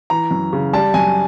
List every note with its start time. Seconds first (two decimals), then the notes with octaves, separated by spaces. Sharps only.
0.10 E3 A#5
0.31 F#2
0.53 C#3
0.73 G3 A5
0.94 F#2 G#5